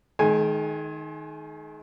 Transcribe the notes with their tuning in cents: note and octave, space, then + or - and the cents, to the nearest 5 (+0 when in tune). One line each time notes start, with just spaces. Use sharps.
D#3 +5 G#3 +40 G#5 +0